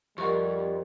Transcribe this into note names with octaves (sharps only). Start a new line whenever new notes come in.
F2 G3 G4 A#4 D#5 F#5 C#6